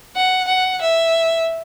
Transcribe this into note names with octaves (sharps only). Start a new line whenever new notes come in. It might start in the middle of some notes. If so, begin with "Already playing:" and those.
F#5
F#5
E5